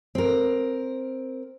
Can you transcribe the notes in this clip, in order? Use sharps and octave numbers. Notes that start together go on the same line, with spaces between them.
C4 A#4